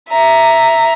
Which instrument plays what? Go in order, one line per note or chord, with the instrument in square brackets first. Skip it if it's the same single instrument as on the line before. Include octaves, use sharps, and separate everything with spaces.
[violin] E5 A#5